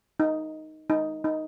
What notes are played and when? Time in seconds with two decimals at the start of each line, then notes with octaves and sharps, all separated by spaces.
0.20 D#4
0.90 D#4
1.24 D#4